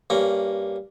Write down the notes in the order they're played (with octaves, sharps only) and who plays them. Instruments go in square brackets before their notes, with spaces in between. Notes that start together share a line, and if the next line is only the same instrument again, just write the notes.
[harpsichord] G2 A#3 C#4